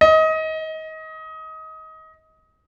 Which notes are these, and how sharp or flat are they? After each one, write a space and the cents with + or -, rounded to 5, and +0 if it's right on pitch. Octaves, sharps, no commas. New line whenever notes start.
D#5 +25